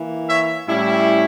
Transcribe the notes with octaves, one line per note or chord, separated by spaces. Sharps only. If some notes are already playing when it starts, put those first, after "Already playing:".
Already playing: E3 A#3 E4
C#5 E5
A2 G3 C#4 E4